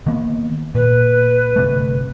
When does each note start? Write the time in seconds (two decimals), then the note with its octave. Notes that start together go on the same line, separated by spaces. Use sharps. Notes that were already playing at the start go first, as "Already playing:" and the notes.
0.06 D#3 A#3 B3
0.75 A#2 B4
1.56 G1 C3 A3